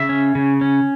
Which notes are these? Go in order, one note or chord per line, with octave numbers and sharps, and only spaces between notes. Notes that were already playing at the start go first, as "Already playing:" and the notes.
Already playing: C#3 E5
C#4
C#3
C#4